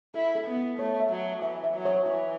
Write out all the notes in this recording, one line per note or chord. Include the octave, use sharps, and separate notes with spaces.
E4 A4
A4
B3
E4
A3 C#5
E5
F#3
E5
E3 E5
E5
F#3
C#5
E3 E4